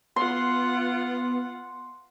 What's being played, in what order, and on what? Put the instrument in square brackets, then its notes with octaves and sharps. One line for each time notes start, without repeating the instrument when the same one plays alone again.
[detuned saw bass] B3 [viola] F4 F#5 [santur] C6